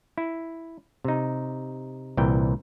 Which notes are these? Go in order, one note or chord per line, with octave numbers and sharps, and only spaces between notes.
E4
C3 D#4
C2 A#2 E3 G5